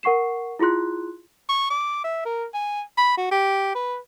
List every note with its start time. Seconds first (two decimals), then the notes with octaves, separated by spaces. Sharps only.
0.03 A#4 F#5 C#6 C7 E7
0.59 E4 F4 G#4 C6 F#6
1.49 C#6
1.70 D6
2.04 E5
2.25 A#4
2.54 G#5
2.97 B5
3.17 F#4
3.31 G4
3.75 B4